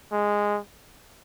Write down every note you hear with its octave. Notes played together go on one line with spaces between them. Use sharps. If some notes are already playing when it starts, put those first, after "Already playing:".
G#3